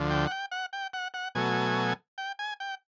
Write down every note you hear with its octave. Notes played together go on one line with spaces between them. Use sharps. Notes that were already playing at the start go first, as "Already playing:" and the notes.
Already playing: D2 D3 F3
G5
F#5
G5
F#5
G5
F#5
F#5
B2 F#3 A3 G#5
G5
G#5
G5